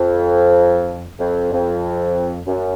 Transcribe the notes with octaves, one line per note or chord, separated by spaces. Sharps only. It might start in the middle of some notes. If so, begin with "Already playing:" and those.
Already playing: F2
F2
F2
F#2